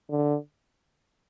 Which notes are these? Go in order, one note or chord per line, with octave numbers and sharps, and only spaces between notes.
D3